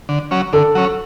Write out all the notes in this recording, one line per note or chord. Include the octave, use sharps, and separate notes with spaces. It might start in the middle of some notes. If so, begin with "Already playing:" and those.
D3
F#3 C#4
D3 A4
F#3 C#4